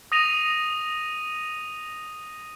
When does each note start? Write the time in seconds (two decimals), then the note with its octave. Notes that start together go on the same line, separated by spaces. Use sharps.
0.12 D#6 A#6 D#7 F7